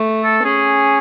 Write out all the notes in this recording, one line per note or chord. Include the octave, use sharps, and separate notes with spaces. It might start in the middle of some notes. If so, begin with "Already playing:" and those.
Already playing: A3
A4
C#4 G#4